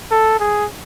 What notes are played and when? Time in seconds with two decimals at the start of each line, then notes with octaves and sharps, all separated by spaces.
0.11 A4
0.40 G#4